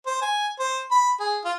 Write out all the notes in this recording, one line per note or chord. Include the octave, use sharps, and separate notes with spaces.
C5
G#5
C5
B5
G#4
F4